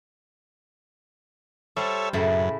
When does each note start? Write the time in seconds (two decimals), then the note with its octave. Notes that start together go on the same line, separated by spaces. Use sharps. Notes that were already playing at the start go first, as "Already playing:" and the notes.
1.77 G3 A4 C5 C#5 E5
2.13 F#2 A2 C#3 E4